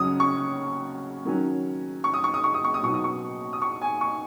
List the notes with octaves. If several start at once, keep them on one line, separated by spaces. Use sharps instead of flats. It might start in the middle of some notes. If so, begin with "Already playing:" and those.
Already playing: F#2 C#3 F#3 C#4 D#6
C#6
D#3 F#3 C#4
C#6
D#6
C#6
D#6
C#6
D#6
C#6
D#6
B2 F#3 D#4 C#6
D#6
C#6
D#6
C#6
G#5
C#6